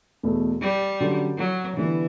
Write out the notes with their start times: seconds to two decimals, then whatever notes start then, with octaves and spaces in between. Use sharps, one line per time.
0.23 E2 B2 A3
0.62 G3
1.01 D3 F#3 C#4 G4
1.38 F#3
1.77 D3 E3 G3 B3